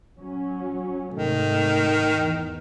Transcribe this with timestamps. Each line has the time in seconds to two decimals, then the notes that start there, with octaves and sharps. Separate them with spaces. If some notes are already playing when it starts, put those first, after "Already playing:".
0.17 F#3 C#4
1.14 G#2 C3 D#3 A3
2.17 E2